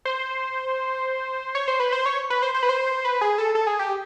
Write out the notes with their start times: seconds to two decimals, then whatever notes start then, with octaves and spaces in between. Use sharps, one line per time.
0.05 C5
1.55 C#5
1.68 C5
1.80 B4
1.92 C5
2.06 C#5
2.30 B4
2.42 C5
2.54 C5
2.63 B4
2.69 C5
3.05 B4
3.21 G#4
3.38 A4
3.55 A4
3.67 G#4
3.79 G4